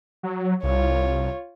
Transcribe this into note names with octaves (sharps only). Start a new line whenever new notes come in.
F#3
C2 F4 C#5